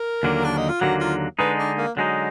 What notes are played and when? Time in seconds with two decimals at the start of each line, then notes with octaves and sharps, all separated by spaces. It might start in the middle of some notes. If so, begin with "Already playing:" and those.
Already playing: A#4
0.23 D#2 D3 F#3 A#3
0.45 D4
0.57 D#4
0.69 F4
0.81 D#2 D3 F#3 A#3 F#4
1.01 F4
1.39 D3 G#3 D#4 B4
1.58 D4
1.77 A#3
1.97 D3 F#3 G#3 D#4